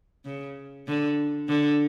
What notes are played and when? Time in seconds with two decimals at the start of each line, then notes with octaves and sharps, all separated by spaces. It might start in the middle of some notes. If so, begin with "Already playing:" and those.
0.25 C#3
0.88 D3
1.48 D3